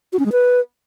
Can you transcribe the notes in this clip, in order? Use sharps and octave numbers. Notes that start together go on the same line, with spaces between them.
F#4
C#4
G#3
B4